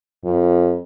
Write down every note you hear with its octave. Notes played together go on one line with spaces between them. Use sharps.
F2